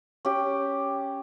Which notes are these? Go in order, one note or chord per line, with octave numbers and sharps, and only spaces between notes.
C#4 G4